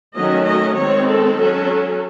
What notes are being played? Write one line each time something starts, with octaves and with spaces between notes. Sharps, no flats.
D#3 F#3 A3 C#4 D#5
D#5
D#3 G#3 C4 C#5
A4
F#3 C#4